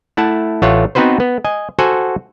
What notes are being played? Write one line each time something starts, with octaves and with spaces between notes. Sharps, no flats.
A3 E4 F#5 A5
A1 A3 F4 C#5 F#5
B3 C4 D#4 F#4 B4 C5
B3
D#5 G#5
F#4 A4 C5 F#5 G#5